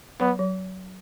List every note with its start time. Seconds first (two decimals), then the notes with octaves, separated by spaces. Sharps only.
0.20 F#3 B3
0.39 F#3